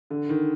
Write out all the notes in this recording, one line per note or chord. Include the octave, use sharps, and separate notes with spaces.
D3
D#3